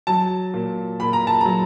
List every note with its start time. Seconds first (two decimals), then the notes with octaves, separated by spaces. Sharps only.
0.07 F#3 A5
0.54 A#2
1.00 A#2 B5
1.13 A#5
1.27 A5
1.41 F#3 A#5